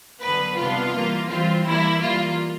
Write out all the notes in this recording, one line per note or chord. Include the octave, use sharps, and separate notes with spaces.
D3 F#3 B3 B4
C3 D#3 G3 B3 D4 F4
E3 G3 A#3
E3 G3 C4 F4
E3 G3 A#3 E4
E3 G3 A#3 F4